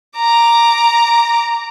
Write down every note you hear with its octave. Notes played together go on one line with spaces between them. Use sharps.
A#5 D6